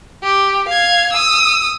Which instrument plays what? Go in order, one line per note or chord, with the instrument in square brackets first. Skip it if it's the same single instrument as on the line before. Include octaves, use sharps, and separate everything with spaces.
[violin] G4
F5 G#6
D#6 E6